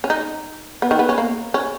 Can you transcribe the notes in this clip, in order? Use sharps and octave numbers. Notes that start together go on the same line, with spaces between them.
C#4
D#4
B3
D#3
B3
C#4
A#3
C#4